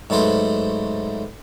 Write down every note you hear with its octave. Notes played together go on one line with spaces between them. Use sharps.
G#2 F#3 A3 B4 C5